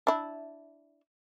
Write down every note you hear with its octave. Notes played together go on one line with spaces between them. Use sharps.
D4 E4